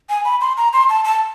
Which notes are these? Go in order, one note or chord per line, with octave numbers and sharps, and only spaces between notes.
G#5
B5
C6
A#5
C6
A5
A5